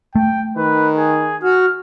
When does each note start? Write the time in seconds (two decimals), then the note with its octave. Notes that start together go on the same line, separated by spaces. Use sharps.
0.16 A3 G5
0.57 D#3 B4
0.97 G#4
1.43 F#4 F6